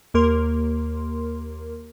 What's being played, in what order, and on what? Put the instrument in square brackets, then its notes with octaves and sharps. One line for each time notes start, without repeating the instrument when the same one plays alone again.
[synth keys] D#2 A#3 A#4 C6